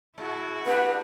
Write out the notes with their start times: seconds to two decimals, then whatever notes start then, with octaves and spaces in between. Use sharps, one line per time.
0.18 G#3 E4 F#4
0.66 A#3 D4 G4 B4